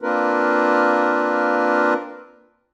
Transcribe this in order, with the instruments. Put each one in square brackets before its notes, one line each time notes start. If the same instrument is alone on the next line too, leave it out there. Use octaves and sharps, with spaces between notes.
[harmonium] A#3 C4 D4 F4 A#4 B4